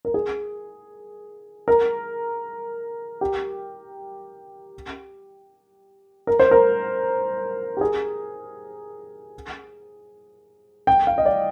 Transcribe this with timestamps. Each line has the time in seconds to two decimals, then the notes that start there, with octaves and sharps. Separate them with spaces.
0.05 A#4
0.14 G#4
1.68 A#4
3.21 G4
6.27 A#4
6.40 C5
6.51 A#4
7.77 G4
7.81 G#4
10.87 G5
11.07 F5
11.18 D#5
11.26 D5